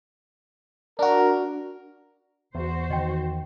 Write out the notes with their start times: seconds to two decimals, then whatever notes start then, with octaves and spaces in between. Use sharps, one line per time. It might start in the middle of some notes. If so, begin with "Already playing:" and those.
0.99 D4 F#4 A#4
2.55 E2 F#4 C5
2.90 D#3 D#5 G5